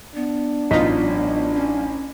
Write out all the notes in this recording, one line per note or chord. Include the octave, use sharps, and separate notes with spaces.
B3 D4
A1 F#3 D#4 F4 D#5 B6
C#4